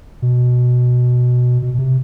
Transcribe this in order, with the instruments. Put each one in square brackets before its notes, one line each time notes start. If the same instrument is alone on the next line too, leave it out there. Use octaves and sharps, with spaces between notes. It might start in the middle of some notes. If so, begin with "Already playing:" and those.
[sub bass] B2
B2
B2
C3